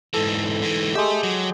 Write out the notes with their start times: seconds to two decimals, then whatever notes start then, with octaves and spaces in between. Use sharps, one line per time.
0.14 G#2 E3 A4
0.62 G#2 E3
0.95 G#3 G4 A4 E5
1.23 F#3